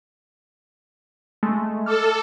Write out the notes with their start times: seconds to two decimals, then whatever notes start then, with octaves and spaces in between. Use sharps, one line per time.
1.43 G#3 A3
1.86 A4 D6 F6